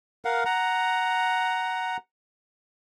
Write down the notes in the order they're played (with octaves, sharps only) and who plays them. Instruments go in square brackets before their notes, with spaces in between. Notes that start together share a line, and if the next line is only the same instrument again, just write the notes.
[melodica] A#4 F5 F#5
F#5 A#5